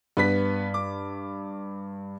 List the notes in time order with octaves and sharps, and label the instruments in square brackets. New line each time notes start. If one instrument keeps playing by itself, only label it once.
[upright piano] G2 [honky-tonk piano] B3 B4 B6
[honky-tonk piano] D6